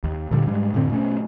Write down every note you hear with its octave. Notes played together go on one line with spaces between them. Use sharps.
D#2
A#2 D3 G3
G#2 G3 G#3
F#2 A2 D3 C4
B2 A3 C#4